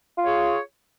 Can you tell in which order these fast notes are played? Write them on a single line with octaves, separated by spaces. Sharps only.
F4 C#5 G#4